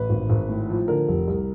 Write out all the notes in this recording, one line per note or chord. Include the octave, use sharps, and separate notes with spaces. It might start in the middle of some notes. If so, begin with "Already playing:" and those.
Already playing: A1 B4
G#1
G#1
A2
F3
D3 A#4
F1
C2